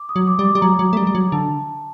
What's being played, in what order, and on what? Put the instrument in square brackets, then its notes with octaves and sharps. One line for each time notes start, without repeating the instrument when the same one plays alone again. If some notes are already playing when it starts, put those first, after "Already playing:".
Already playing: [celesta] D6
D#6
[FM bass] F#3
[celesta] D6
[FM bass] G3
[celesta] D6
[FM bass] G3
[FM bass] F#3 [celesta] A#5
[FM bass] F#3
A3
G3
G3
F#3
[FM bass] D3 [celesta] A5